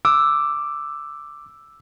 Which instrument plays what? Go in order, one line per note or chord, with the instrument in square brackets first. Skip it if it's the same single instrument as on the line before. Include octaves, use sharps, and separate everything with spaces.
[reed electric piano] D6 [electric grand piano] E6